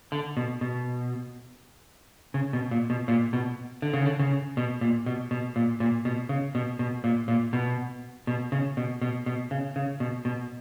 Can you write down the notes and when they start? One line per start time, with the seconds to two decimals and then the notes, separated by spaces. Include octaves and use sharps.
0.12 D3
0.37 B2
0.61 B2
2.34 C#3
2.53 B2
2.71 A#2
2.90 B2
3.08 A#2
3.33 B2
3.82 D3
3.93 C#3
4.05 D3
4.19 C#3
4.57 B2
4.81 A#2
5.06 B2
5.31 B2
5.56 A#2
5.80 A#2
6.05 B2
6.29 C#3
6.55 B2
6.79 B2
7.04 A#2
7.28 A#2
7.53 B2
8.27 B2
8.52 C#3
8.77 B2
9.01 B2
9.26 B2
9.51 C#3
9.76 C#3
10.00 B2
10.25 B2